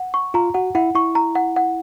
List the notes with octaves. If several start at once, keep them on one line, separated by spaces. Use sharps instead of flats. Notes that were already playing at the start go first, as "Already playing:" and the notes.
Already playing: F#5
C#6
F4 A#5
F#4 F#5
E4 F#5
E4 C#6
A#5
F#5
F#5